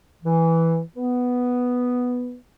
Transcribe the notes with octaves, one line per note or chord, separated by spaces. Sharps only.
E3
B3